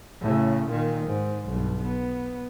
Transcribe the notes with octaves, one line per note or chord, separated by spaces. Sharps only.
A2 C#3
A#2 D#3
G#2
B1 G2
B3